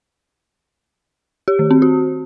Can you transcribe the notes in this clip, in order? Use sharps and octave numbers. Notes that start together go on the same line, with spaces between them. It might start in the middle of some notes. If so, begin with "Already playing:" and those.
G4
D#3
C4
F#4